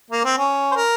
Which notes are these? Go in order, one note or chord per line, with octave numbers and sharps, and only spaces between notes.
A#3
C4
C#4
C5
A#4